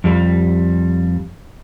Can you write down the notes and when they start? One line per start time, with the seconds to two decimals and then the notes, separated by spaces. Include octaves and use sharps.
0.04 F2 G3